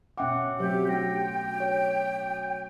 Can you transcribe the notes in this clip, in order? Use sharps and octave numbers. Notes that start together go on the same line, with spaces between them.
B2 C#4 E5 F#5 G5 D6
F#3 A3 C4 G4 C5
D4 G5 G6 A#6
C#5